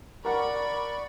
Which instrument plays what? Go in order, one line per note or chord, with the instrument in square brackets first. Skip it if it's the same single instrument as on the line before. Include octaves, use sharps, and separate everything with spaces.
[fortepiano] A#4 F#5 [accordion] D5 C#6 [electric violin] B5